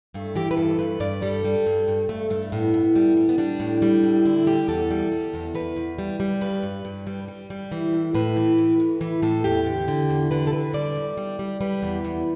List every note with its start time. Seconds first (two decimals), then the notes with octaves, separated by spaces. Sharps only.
0.14 G2 A3
0.35 E3 G4
0.51 B4
0.57 G2 A4
0.79 G2 B4
1.00 G2 D5
1.22 G3 A4
1.44 G3
1.66 G2
1.88 G2
2.09 G2 A3
2.30 G2 A3
2.52 A2 B3
2.74 A2
2.95 G3
3.17 G3
3.29 B3
3.38 G3 D4
3.60 A2
3.82 G3
4.04 A2
4.25 D3 E4
4.47 G3 G4
4.68 E2 A4
4.91 G3
5.12 G3
5.34 E2
5.55 E2 B4
5.76 E2
5.98 G3
6.20 G3
6.41 G2 B4
6.63 G2
6.85 G2
7.07 G3
7.28 G3
7.50 G3
7.72 E3
7.93 A2
8.15 A2 B4
8.36 E3
8.58 A2
8.80 A2
9.01 E3 B4
9.22 A2 A4
9.44 E2 G4
9.66 D3
9.88 D3
10.09 E2
10.31 D3 B4
10.47 A4
10.53 D3 B4
10.73 G3 D5
10.96 E2
11.17 G3
11.39 G3
11.61 G3 B4
11.82 E2
12.04 E2